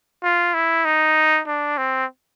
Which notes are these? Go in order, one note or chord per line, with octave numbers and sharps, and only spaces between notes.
F4
E4
D#4
D4
C4